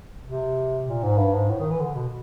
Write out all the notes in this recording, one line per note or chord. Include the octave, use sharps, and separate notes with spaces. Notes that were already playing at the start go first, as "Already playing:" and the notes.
C3
A#2
G#2
G2
G#2
A2
D#3
E3
D3
B2